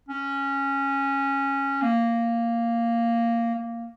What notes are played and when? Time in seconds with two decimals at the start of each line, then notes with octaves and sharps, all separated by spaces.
0.09 C#4
1.82 A#3
3.55 A#3